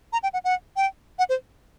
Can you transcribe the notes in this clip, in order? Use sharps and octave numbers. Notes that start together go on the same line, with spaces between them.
A#5
G5
F#5
F#5
G5
F#5
C5